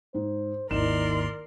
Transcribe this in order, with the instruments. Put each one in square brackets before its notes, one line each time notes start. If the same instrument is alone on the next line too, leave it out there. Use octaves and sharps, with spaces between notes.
[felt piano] G#2 [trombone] C5
[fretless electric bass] G#1 D#2 [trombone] D#4 [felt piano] E4 E7 [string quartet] A#4 D5 C6